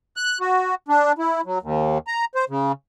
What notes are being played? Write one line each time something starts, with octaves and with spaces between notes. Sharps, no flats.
F#6
F#4
D4
E4
F#3
D#2
A#5
C5
C#3